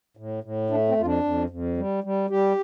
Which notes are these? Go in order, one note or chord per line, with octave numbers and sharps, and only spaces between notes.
A2
A2
A3 D4
C4
F2 F4
D4
F2
F2
G3
G3
G3 G4